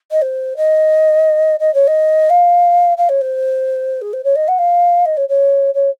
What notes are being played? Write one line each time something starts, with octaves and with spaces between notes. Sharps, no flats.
D#5
C5
D#5
D#5
C#5
D#5
F5
F5
C#5
C5
G#4
C5
C#5
D#5
F#5
F5
D#5
C#5
C#5
C#5